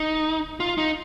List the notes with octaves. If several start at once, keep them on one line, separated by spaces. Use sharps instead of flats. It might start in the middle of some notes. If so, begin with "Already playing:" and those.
Already playing: D#4
F4
D#4